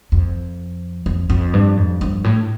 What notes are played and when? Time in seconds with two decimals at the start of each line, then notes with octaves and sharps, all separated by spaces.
0.12 F2
1.06 F2
1.30 F2
1.54 G2
1.77 F2
2.01 G2
2.24 A2